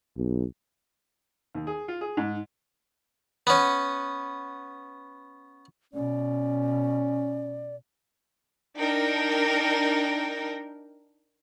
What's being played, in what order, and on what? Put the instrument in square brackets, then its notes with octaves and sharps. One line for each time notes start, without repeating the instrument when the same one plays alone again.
[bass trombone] B1
[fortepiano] D#2
G#4
F4
G#4
G#2
[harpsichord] B3 C#4
[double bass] B2 [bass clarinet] C#4 [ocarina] D5
[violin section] D4 D#4 A#4 G5